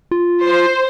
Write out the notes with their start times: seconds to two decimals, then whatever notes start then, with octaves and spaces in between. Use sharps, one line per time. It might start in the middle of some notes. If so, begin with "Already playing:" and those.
0.11 F4
0.44 C5